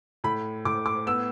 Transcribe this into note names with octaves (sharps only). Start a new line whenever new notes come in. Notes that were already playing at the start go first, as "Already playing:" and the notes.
A2 B5
A2 D6
D6
B3 E6